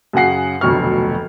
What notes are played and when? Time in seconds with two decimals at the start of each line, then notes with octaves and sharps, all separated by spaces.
0.13 F#2 C#3 G#4 F#5 C7
0.61 F1 D2 B2 F#3 C#6 F6